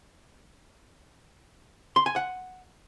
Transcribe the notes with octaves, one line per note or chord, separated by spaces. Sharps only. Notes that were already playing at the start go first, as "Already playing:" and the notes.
C6
G#5
F#5